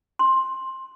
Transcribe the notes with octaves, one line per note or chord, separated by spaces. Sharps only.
C6